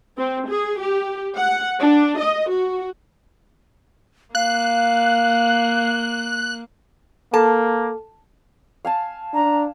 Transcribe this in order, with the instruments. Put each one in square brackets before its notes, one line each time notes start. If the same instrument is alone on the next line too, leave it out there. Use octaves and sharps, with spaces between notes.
[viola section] C4
G#4
G4
F#5
D4
D#5
F#4
[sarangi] A#3 [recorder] F5 [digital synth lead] F#6
[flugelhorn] A#3 [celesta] A4 [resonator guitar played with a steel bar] A5
[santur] F5 G#5 A5
[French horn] D4 [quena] A#5